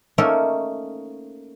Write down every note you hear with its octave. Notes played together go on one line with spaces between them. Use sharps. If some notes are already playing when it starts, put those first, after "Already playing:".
A3 A#3 C#4 D#4 A4 A#4